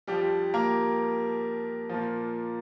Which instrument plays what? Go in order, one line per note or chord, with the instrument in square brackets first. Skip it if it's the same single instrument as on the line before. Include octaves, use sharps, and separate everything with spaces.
[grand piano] F2 F3 G3 G4
A#3 A#4
A#2 F3